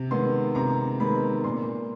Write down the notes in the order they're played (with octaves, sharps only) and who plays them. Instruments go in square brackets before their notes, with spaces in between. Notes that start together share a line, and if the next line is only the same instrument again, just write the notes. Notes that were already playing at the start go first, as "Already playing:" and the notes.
Already playing: [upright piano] C3
D#3 G#3 B3 C6
C3 A#5
D#3 G#3 B3 B5
A#2 C6